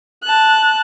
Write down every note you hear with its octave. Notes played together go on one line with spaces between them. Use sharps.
A5 F#6